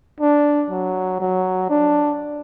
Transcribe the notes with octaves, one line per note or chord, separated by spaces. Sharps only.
D4
F#3
F#3
D4